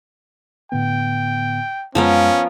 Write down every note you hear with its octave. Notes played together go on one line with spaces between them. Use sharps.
A2 D3 B3 G5
F#2 F3 G#3 B3 C#4 A#4